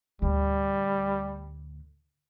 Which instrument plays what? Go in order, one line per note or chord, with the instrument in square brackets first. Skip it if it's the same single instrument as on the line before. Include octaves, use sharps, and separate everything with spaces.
[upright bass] D2 A2 [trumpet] G3